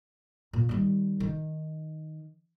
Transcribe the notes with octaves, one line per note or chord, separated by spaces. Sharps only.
A#2
D#3 G3
D#3